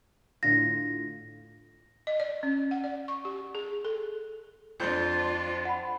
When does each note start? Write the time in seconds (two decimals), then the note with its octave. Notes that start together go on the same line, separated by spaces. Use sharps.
0.43 A2 D3 F4 A#6
2.07 D#5
2.20 D5
2.43 C#4
2.71 F#5
2.84 D5
3.08 C#6
3.25 G4
3.55 G#4
3.85 A4
4.80 F2 D4 F4 C5 G6
5.65 F#5 B5